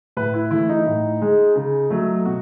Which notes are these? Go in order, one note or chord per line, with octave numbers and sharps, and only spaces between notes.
A2 B4
E4
E3 A3 E4
D#4
A2
G#3
C#3
F#3 A3
B2 F#4